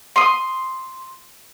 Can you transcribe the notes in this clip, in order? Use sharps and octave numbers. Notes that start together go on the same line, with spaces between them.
C6 D#6